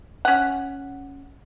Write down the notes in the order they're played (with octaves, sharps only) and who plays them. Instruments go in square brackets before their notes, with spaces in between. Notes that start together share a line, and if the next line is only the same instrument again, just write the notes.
[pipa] C#4 F#5